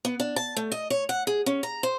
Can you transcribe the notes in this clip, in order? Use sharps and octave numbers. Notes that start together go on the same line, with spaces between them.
B3
D4
A5
A3
D#5
C#5
F#5
G#4
C#4
A#5
C5